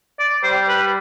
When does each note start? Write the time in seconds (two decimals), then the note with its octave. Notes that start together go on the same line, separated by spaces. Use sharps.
0.19 D5
0.43 G3 C5
0.68 B4